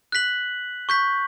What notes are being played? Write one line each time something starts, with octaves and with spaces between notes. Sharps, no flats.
F#6 B6 F#7
C#6 G6 B6